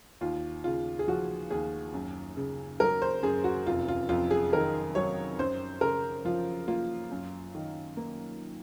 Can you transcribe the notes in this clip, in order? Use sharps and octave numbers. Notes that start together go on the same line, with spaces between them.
D#2 F4
C#3 F4
G#4
F3 F#4
D#2 G#4
F#2
C#3
F#3 A#4
C5
F#2 G#4
F#4
F1 F4
F4
F2 F4
G#4
D#3 A#4
F#3 C#5
F#2 C5
C#3 A#4
F3 F4
A#3 F4
F#2
D#3
A#3